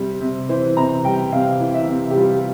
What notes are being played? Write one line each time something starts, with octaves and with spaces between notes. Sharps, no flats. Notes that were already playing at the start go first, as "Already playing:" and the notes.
Already playing: C3 G3
C3
E3 C5
C3 A#5
G3 G5
C3 F5
E3
E5
C3
G4
G3 F4